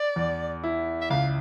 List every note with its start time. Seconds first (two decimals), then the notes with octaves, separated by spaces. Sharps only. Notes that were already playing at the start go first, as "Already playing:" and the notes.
Already playing: D5
0.16 E2
0.64 E4
1.01 E5
1.10 C#2 F5